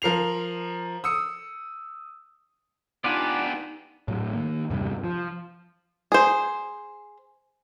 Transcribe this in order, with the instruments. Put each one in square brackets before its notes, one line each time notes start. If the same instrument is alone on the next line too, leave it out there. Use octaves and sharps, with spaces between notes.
[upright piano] F3 A#4 C7 F7
D#6 E6 C#7
[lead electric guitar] B3 G4 [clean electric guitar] D4 F4 [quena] D#4 [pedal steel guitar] D5 F#5 G#5
[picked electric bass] A2 F#3
D#3 A#3
E2 G2 C3 G3
F3
[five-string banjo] G#4 C5